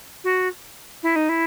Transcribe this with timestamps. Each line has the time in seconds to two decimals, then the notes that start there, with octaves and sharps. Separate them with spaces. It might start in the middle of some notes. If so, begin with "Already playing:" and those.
0.24 F#4
1.03 E4
1.16 D#4
1.29 E4